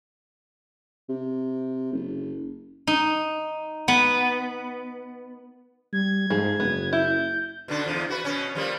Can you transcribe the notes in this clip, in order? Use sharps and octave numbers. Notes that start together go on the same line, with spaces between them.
C3
F#1
D#4
B3
G3 G#6
G#2 F3 G#4
F#1 B3
E4 G6
B2 D3 D4
E2 F3
F#4 B4
B2 C#4
F3 G3 A#3